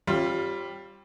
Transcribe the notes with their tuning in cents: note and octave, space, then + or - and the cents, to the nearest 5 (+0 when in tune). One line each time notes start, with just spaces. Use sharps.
G3 +0 C#4 -40 F4 +0